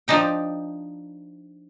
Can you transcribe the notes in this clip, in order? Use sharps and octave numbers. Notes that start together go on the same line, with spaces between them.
F3 D4 D#4 G5